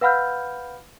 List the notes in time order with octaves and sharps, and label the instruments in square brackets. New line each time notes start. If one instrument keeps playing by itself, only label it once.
[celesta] B4 F5 F#5 B5 F6 G6